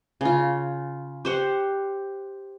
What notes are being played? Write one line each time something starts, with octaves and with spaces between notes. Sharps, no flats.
C#3 F4
G4 C5 F#5